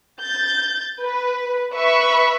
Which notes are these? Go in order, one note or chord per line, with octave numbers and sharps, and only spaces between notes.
G6 A6
B4
B4 E5 B5 C#6